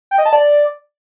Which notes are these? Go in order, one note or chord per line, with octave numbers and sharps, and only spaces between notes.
G5
D#5
A5
D5